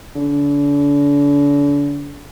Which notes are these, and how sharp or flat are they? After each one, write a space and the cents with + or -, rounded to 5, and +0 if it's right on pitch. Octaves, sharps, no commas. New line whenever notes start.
D3 -40